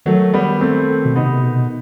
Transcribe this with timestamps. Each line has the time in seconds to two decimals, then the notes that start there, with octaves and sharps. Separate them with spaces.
0.06 D#3 F#3 A3
0.34 G3 B3
0.61 A3 C4
1.05 B2
1.16 C3 B3 D#4
1.43 B2